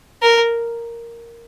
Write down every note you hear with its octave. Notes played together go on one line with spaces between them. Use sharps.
A#4